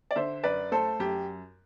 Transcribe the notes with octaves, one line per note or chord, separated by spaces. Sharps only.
D5
D3 C5 E5
F#2 B4 D5
A3 A4 C5
F#2 G4